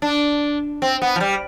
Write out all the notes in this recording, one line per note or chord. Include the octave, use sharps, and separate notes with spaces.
D4
C4
B3
F3
G3